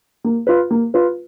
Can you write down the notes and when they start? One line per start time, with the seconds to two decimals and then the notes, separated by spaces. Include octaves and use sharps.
0.24 A#3
0.47 F4 B4
0.71 A#3
0.94 F4 B4